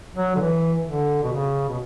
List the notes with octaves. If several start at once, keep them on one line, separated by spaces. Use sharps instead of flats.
F#3
D3
E3
D3
B2
C#3
B2